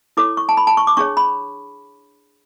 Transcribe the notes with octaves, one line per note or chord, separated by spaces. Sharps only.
E4 A4 C#5 D6
C#6
A5
B5
A5
C#6
D6
D4 G#4 C#5 C#6
B5